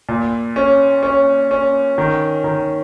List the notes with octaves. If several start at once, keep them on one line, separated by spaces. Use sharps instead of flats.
A#2
C#4
C#4
C#4
D#3
D#3